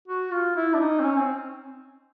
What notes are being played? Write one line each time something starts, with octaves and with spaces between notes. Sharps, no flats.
F#4
F4
E4
D4
D#4
C4
C#4
C4